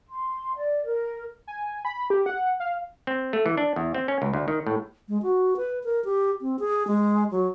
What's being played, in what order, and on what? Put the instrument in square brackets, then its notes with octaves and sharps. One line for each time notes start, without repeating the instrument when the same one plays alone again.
[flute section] C6
D5
A#4
[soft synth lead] G#5
B5
G4
F#5
F5
[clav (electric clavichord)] C4
A3
E3
D4
E2
C4
C#4
C#2
D2
D#3
A2
[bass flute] G#3
F#4
B4
A#4
G4
C4
G#4
G#3
F#3